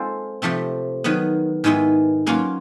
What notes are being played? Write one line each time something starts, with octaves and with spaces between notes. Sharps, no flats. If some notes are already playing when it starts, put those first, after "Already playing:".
Already playing: G#3 C4 F4 A4 C5
C3 F3 A3 C4
D#3 F#3 B3
G#2 D#3 G#3 B3 E4
F#3 A#3 C#4 F4